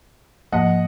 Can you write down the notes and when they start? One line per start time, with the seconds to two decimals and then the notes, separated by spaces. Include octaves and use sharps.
0.52 G#2 F3 A#3 D#5 F#5